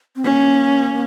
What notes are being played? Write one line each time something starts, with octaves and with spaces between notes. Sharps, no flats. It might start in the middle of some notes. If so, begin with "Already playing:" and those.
C4
A#3 C#4